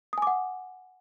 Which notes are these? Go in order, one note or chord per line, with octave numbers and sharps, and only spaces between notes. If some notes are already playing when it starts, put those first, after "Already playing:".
F#5 G#5 D6 D#6